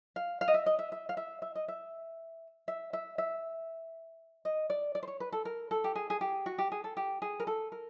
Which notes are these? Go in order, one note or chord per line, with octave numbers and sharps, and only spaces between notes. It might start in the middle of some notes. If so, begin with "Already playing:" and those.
F5
F5
D#5
E5
D#5
E5
E5
F5
E5
E5
D#5
E5
E5
E5
E5
D#5
D5
D5
C5
C#5
B4
A4
A#4
A4
G4
G#4
G#4
G4
F#4
G4
G#4
A4
G4
G#4
A#4
A4
A#4